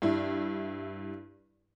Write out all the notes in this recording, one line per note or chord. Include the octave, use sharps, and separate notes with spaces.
G2 E4